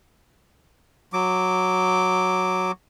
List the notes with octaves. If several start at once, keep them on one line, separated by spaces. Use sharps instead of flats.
F#3 D6